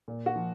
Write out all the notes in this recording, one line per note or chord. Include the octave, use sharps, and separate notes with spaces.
A#2
F#4
F3